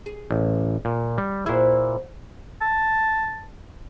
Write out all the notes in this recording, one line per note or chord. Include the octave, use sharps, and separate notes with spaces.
G#4
A1
A#2
G3
A#2 E4 F#4 G#4 C5
A5